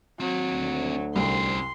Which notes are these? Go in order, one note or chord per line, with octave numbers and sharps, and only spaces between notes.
D#2 F#3 C4
D2
C2 C#4 C5 C6